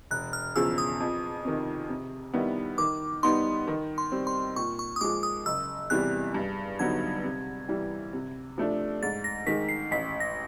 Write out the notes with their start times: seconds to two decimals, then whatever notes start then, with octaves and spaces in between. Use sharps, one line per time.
0.11 E1 F#6
0.33 F6
0.56 E2 C#3 F3 E6
0.78 D#6
1.00 F2
1.45 C3 D#3
1.89 C3
2.34 D#3 G3 B3 E4
2.78 D#3 D6
3.23 G3 B3 D#4 C6
3.68 D#3
3.98 C6
4.12 G3 C4
4.27 C6
4.56 A#2 C#6
4.79 C#6
4.96 D#6
5.01 F3 G#3 D6
5.23 D#6
5.46 F#1 E6
5.90 E2 C3 E3 G3 F#6
6.35 G2
6.79 D3 F#3 B3 D#4 G#6
7.24 C3
7.69 E3 G3
8.13 C3
8.58 F3 A3 D4
9.03 G#2 A6
9.24 A#6
9.47 D#3 G#3 B6
9.68 C7
9.91 A1 B6
10.20 A#6